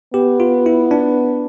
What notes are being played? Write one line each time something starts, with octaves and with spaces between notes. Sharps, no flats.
B3 G4
F4
E4
D4